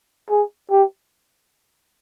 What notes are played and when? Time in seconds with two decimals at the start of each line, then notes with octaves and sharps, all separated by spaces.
0.30 G#4
0.71 G4